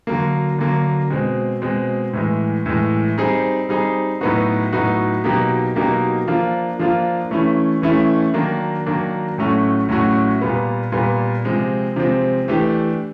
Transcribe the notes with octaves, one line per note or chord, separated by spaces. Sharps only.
D3 F#3 A#3
D3 F#3 A#3
B2 G#3 C4
B2 G#3 C4
A2 E3 G#3
A2 E3 G#3
G3 C4 D#4 G#4
G3 C4 D#4 G#4
A2 F#3 B3 D#4 F#4
A2 F#3 B3 D#4 F#4
B2 F#3 A#3 D#4 G4
B2 F#3 A#3 D#4 G4
F3 A#3 D4 F4
F3 A#3 D4 F4
E3 A3 C#4 E4
E3 A3 C#4 E4
D#3 F#3 A#3 D4
D#3 F#3 A#3 D4
A2 F#3 A3 C#4 F#4
A2 F#3 A3 C#4 F#4
A#2 G3 B3
A#2 G3 B3
C3 F3 G#3 C4
C3 F3 G#3 C4
E3 A3 D4 G4